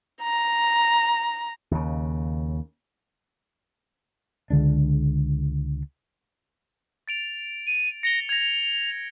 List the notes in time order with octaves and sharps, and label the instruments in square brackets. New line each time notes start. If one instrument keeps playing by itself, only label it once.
[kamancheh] A#5
[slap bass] D#2 C#3
[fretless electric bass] C#2 D3 G#3 D4
[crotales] A6 D7 F7
[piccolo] D#7
[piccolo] A#6 [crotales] C#7 F7 G7
[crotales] G#6 A#6 [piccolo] F7